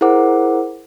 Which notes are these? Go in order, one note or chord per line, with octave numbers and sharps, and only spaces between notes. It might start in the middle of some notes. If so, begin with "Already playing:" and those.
E4 G#4 A#4 C5 F#5 D6